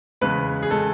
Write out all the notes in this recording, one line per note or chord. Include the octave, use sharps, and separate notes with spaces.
E2 C#3 G#3 B4
G#4
C#3 G#3 A4